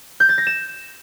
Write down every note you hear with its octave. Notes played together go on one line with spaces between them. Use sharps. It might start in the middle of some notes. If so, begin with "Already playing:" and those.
G6
A6
A#6
E7